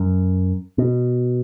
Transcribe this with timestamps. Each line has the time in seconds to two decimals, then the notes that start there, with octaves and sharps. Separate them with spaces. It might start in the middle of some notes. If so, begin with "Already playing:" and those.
Already playing: F#2
0.78 B2